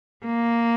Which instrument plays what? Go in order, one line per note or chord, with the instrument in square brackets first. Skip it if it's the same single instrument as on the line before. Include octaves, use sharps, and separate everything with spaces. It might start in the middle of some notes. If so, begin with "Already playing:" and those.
[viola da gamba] A#3